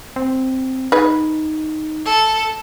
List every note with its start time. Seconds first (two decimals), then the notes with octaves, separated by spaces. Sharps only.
0.16 C4
0.92 D#4 G#4 B4
2.06 A4